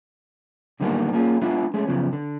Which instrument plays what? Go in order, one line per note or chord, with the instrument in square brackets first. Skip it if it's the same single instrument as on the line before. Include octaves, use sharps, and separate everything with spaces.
[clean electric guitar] F#2 D3 D#3 G3 A#3 B3
A#3 C#4 F4 G#4
G#3 B3 D4 E4 F4
G#3 A3 C#4
F#2 C#3 F3 B3
D3